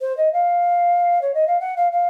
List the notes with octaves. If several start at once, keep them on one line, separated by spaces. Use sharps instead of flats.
C5
D#5
F5
C#5
D#5
F5
F#5
F5
F5